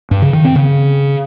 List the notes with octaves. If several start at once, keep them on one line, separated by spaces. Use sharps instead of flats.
G2
C#3
D#3
C4
C#3